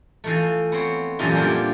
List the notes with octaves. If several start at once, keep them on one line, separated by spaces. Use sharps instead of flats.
E3 F3 A3
B3 C4 C#5
F#2 A#2 E3 F3 A3 G4
F3 G3 A#3 D4